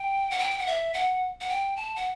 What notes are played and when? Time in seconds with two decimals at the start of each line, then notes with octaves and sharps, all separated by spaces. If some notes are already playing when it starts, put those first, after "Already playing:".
Already playing: G5
0.31 F#5
0.39 G5
0.51 G5
0.59 F#5
0.67 E5
0.94 F#5
1.41 F#5
1.49 G5
1.76 A5
1.96 F#5